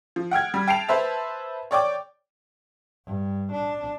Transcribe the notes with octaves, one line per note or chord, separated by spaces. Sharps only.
F3
F#5 G5 F6 G#6
G3
G5 A5 C7 D7 F7
B4 C5 E5 A5
C#5 D5 G5 D6
G2
D4